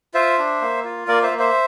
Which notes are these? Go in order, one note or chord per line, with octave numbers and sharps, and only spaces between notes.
F4 C5 E5
D4
A#3
F4
A#3 A#4 D5
C5 E5
A#3
C5 E5